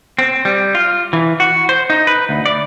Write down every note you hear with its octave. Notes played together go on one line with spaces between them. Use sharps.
C4
G3
F4
E3
F#4
C5
D#4
B4
D2
D5